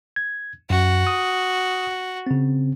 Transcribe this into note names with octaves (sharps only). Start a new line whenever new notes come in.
G#6
F#2 F#4
D#6
C#3 C4